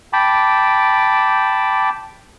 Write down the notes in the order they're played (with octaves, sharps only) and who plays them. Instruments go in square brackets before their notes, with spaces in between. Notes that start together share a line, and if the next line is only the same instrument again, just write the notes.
[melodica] G5 A5 B5 D6